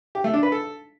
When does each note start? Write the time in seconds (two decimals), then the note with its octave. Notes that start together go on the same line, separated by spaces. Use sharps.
0.15 G4
0.24 A3
0.33 D4
0.43 B4
0.52 A4